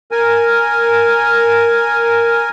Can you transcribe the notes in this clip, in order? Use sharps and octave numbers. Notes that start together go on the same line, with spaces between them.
A#4 G#5